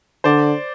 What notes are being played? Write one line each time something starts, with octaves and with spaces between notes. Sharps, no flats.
D3 C5 D5